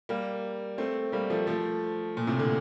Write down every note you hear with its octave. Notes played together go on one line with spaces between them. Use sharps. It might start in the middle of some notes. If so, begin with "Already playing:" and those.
G3 A#3
A3 C4
G3 A#3
F3 A3
F3 A3
A#2
A2 C3
A#2 D3